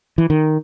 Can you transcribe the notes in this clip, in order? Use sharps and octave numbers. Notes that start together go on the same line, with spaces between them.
E3
D#3